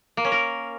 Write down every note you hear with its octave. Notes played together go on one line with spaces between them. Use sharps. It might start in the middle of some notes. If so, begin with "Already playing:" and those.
A#3
C#4
A#4